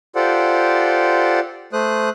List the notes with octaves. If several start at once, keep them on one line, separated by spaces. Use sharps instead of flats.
F4 G4 A4 C5 D5 F#5
A3 C5 D#6 F#6